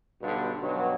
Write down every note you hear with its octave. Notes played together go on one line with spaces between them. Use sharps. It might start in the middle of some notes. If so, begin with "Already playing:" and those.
B1 G2 B2 D3
G2 B2 F#3